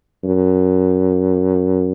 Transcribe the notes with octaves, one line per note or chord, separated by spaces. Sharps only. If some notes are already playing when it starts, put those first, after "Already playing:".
F#2